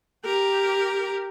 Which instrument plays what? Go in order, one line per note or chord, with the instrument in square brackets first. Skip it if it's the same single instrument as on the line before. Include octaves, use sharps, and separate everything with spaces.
[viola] G4 A#4